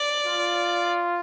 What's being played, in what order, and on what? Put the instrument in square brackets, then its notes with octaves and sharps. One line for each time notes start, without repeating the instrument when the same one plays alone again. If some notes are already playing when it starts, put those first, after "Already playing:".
Already playing: [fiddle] D5
[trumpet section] F4